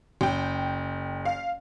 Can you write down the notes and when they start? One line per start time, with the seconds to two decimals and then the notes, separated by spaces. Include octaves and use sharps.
0.21 F#1 G5
1.25 F5